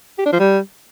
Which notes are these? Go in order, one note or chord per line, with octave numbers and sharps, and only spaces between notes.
G4
D4
F3
G3